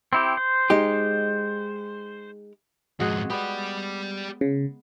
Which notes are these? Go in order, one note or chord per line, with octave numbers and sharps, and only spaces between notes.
C4 E4 G4
C5
G#3 D#4 G4
F2 G#2 G#3 F#4 G#4
B3 G4 D5
C#3